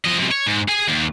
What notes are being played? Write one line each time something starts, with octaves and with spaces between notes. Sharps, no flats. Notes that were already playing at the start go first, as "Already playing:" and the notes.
F3 D#5
F#2 C3
C#5
G#2
G#4 G#5
D#2